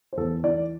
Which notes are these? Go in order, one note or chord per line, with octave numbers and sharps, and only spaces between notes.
C5
E2 A4
E3 D5